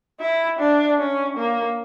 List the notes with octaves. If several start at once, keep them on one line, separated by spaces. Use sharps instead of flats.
E4
D4
C#4
A#3